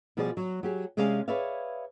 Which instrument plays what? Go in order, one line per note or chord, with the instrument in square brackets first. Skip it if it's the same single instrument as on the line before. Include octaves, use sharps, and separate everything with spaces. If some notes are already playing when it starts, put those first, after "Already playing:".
[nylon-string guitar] B2 F3 G3 G#4 B4 D5
F#3
F#3 G4 G#4
C3 G#3 C#4 G#4 D5 F5
G#4 B4 C#5 D5 E5 F5